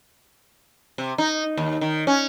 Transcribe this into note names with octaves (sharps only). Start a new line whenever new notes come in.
C3
D#4
D#2
D#3
C#4